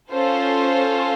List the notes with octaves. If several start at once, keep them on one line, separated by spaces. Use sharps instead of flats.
C#4 F4 A4 C5